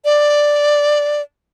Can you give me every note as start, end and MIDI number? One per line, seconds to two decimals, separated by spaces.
0.05 1.22 74